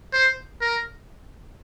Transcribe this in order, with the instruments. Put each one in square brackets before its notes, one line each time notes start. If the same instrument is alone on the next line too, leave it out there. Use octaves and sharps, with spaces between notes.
[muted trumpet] C5
A#4